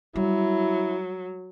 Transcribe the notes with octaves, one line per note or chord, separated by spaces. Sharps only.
F#3 G3 E4